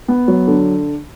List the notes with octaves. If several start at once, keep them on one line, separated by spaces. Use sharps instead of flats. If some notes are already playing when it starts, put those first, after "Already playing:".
B3
F#3
D3